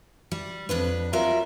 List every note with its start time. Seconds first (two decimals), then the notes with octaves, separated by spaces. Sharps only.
0.32 G3
0.69 F2 A#2 D4 B4
1.13 F#3 G3 F4 A#4 E5